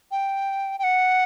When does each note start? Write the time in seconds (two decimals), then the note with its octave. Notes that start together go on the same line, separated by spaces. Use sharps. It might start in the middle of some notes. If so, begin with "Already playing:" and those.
0.11 G5
0.79 G5
0.84 F#5